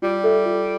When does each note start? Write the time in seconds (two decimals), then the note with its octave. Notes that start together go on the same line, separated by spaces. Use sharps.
0.02 G3 F4
0.24 A4 E5
0.46 F4